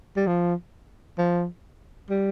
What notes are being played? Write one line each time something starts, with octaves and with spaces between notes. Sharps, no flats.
G3
F3
F3
G3